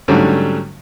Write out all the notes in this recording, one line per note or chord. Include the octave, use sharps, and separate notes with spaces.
G#2 D3 F#3 G3 A3 C#4